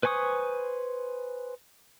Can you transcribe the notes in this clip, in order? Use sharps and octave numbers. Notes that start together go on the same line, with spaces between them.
B4 C5 G#5 C#6 D#6